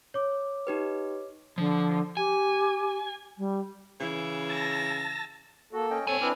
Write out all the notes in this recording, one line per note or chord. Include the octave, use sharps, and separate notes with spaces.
C#5 D6
D#4 G4 B4
D3 F3
G4 G#5
G3
C#3 E3
A5 E6 A#6
A#3 F#4 A4
C#4 D#5 G5
G3 C4 A4 C#5 G#5
C4 D4 E4 B4 D6 F6